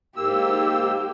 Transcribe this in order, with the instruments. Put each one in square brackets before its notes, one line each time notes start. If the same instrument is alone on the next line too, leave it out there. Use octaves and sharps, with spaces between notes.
[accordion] G#2 A#3 E6 [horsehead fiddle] G4